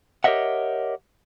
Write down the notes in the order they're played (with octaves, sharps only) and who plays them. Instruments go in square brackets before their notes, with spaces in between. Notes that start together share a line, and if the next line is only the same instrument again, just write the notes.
[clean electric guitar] G4 A#4 C#5 D#5 E5 F#5